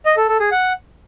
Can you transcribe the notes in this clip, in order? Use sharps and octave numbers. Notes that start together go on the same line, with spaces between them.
D#5
A4
A4
G#4
F#5